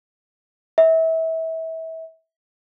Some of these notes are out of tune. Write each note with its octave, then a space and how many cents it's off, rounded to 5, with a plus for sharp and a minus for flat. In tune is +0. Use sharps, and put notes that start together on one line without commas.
E5 -30